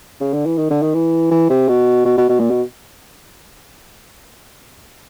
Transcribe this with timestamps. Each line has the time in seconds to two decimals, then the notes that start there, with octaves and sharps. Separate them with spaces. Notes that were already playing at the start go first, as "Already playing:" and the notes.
0.20 C#3
0.33 D3
0.46 E3
0.57 D#3
0.70 D3
0.83 D#3
0.94 E3
1.31 E3
1.50 C3
1.68 B2
2.05 B2
2.17 B2
2.29 B2
2.40 A#2
2.50 B2